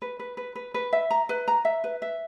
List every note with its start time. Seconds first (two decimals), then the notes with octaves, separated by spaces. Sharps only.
0.02 B4
0.19 B4
0.37 B4
0.55 B4
0.74 B4
0.93 E5
1.11 A#5
1.29 B4
1.48 A#5
1.65 E5
1.84 B4
2.02 E5